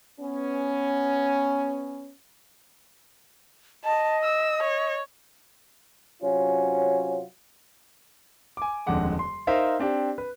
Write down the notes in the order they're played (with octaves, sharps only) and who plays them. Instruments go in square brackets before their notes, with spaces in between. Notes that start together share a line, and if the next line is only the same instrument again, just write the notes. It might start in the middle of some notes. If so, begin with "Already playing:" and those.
[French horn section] B3 C#4
[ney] D#5 [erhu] A5
[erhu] E6
C#5
[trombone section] C3 F#3 C#4 F4
[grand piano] G#5 D6
D#1 F2 D3 G#3 F#5 D6
C6
D#4 A#4 C5 E5 F5
C4 D4 G4
B4